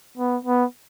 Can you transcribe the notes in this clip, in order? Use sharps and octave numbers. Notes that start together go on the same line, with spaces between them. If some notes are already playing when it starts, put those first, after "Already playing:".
B3
B3